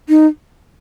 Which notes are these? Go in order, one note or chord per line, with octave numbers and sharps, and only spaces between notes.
D#4